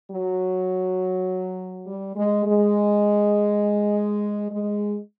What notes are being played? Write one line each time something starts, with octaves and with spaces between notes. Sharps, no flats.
F#3
G3
G#3
G#3
G#3